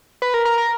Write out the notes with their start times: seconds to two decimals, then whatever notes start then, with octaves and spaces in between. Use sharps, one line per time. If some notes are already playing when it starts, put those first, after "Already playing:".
0.22 B4
0.34 A#4
0.45 A#4
0.58 A#4